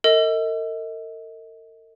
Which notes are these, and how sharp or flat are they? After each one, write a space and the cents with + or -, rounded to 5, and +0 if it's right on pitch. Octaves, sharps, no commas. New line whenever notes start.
A#4 -45 D#5 +30